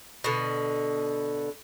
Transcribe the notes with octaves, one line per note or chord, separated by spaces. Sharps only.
B2 D3